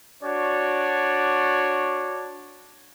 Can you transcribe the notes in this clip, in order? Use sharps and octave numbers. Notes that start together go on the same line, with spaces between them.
D4 F#4 C#5 D5